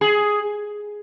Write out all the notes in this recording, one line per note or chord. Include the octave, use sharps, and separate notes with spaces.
G#4